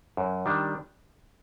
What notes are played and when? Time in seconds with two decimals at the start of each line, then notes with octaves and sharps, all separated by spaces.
0.17 F#2
0.46 D#3 G3 D4